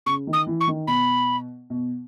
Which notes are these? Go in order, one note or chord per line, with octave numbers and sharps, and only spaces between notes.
C#3 C#6
D#3
D#6
E3
C#6
D#3
B2 B5
B2